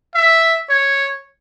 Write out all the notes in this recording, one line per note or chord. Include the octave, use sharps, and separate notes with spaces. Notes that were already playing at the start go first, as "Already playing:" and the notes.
E5
C#5